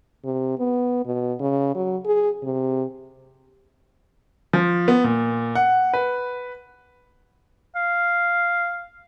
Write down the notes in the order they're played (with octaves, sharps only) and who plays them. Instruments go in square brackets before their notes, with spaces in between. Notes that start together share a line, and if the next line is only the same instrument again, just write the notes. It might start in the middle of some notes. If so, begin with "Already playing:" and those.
[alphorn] C3
B3
B2
C#3
F#3
G#4
C3
[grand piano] F3
B3
A#2
F#5
B4
[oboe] F5